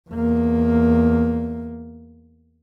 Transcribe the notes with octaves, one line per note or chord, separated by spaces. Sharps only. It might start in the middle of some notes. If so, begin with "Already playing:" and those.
E2 A#3